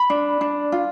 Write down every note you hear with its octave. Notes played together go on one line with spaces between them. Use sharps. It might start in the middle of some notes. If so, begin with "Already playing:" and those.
Already playing: B5
D4
D4
F4